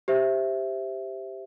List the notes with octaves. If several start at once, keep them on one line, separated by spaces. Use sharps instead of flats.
G4 C5 E5